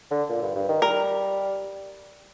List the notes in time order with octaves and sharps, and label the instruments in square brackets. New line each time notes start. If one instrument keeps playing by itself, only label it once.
[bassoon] D3
A#2
G2
G2
D#3
[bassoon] G3 [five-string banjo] A#4